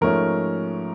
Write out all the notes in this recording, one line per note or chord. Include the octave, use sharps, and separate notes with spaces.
G#2 F3 A3 C#4 A#4